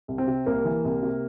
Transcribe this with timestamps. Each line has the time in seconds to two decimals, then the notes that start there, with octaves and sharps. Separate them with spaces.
0.08 C2
0.18 C4
0.27 C3
0.47 C2 A#3
0.65 E3
0.85 C2
1.03 C3